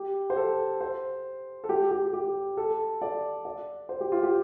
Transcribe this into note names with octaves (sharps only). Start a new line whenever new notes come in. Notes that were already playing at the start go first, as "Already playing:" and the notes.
Already playing: G4
C5
A4
C5
A4
G4
G4
G4
A4
D5
D5
C5
G4
F4
G4